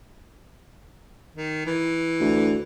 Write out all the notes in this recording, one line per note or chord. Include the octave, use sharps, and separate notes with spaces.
D#3
E3
D2